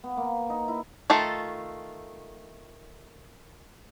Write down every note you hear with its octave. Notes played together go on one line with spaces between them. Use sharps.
B3
A#3
D#4
E4
D#3 A3 F4 A4